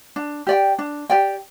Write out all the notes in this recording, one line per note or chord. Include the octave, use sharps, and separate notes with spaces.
D4
G4 D5 G5
D4
G4 D5 G5